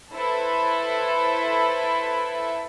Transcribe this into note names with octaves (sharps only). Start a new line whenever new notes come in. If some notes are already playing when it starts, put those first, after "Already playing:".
E4 A4 B4 C5 E5